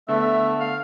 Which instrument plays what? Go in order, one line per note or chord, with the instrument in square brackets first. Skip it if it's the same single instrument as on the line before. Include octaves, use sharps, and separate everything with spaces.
[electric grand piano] D3 B3 A4 [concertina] A3 [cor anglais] E5
[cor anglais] F5